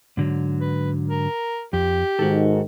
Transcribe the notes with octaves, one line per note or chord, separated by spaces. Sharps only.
G#2 D3 F#3
B4
A#4
F2 G4
G#2 D#3 F#4 A4